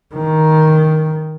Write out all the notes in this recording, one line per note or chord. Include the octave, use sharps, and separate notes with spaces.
D#3